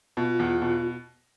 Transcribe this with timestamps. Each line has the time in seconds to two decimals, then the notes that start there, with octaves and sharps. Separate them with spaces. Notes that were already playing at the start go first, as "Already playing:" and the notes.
0.17 B2 F4
0.39 E2
0.62 B2